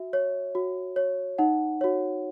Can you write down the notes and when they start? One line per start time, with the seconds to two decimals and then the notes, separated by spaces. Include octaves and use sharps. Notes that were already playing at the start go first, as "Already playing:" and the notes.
Already playing: F#4 E5
0.13 C#5
0.55 F#4
0.96 C#5
1.38 D#4 F#5
1.81 F#4 C#5